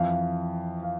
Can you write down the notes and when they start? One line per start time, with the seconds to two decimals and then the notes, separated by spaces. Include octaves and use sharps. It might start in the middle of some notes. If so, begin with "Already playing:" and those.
Already playing: F2 E3 F5
0.14 F5
0.83 F5